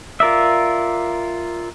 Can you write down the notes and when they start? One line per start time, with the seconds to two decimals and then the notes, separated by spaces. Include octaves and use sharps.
0.20 F4 A#4 D5 E5